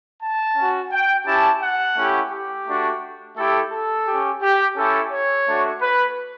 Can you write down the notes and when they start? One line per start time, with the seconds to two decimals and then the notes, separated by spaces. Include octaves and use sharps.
0.21 A5
0.56 C#4 F#4
0.91 G5
1.26 C#4 E4 G4 A5
1.61 F#5
1.96 A3 C#4 E4 G4
2.31 G4
2.67 A3 D4 F#4
3.36 A3 E4 G4 A4
3.71 A4
4.06 G4
4.11 C#4
4.41 G4
4.76 C#4 E4 G4 A4
5.11 C#5
5.46 A3 D4 F#4
5.81 B4